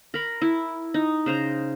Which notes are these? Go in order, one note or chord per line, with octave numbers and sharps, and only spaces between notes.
A#4 B5
E4
D#4
C#3 C5 A#5